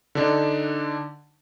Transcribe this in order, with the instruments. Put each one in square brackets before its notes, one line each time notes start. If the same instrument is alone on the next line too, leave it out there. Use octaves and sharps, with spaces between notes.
[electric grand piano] D3 D4 D#4